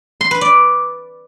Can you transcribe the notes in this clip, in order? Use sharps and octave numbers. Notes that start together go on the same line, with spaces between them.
C6
B4
D5